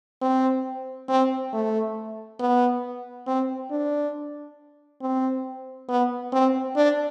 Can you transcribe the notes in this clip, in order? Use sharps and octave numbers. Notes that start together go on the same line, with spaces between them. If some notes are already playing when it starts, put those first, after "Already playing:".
C4
C4
A3
B3
C4
D4
C4
B3
C4
D4